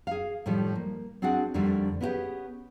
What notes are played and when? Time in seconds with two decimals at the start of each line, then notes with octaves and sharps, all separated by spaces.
0.07 G#4 F5
0.46 A2 D#3 F3 G3
0.75 A#3
1.22 C4 D4 F#4 G#4 F#5
1.54 F2 D3 D#3 G3 A3 D4
2.01 B3 C#4 E4 F4 G4 G#4